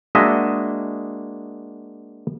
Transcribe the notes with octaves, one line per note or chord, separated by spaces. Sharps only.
G#3 A#3 D4 F#4 D#5 E5